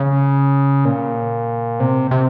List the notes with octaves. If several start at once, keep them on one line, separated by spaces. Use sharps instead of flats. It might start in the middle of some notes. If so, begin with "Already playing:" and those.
Already playing: C#3
A#2
C3
C3